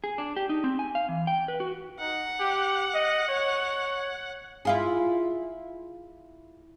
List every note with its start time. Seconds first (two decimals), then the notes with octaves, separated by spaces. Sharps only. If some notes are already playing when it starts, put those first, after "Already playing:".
0.04 G#4
0.18 D4
0.37 G4
0.49 D#4
0.64 C4
0.79 G#5
0.95 F5
1.09 E3
1.27 G5
1.48 B4
1.60 F#4
2.00 D#4 F#5
2.39 G4
2.94 D#5
3.28 C#5
4.65 E4 F4 G#4